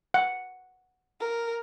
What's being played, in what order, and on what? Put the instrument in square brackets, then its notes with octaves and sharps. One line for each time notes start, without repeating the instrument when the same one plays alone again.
[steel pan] F#5
[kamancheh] A#4